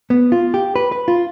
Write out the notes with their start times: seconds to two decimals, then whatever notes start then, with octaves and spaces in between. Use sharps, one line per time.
0.10 B3
0.32 F4
0.54 G4
0.75 B4
0.92 B4
1.08 F4